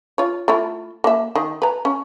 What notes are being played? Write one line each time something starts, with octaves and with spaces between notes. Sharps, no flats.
F4 C#5
A3 E4 F4
A#3 E5
D#3
B4 A#5
C#4